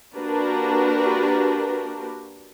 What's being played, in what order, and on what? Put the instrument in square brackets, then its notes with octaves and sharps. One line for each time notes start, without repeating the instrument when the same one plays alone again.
[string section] A#3 D4 F#4 G4 A#4 B4